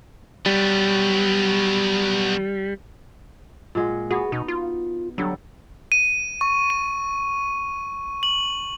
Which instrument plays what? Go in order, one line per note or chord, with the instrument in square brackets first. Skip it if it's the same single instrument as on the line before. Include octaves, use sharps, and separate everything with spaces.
[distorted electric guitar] F#3 B3 [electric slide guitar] G3
[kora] A#2 G#3 F#5
[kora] B3 F#4 [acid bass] G#4
[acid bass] B2 [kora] D#4
[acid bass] F4
[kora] D3 G3 [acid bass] F#3
[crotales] D#7
C#6
D#7
F#7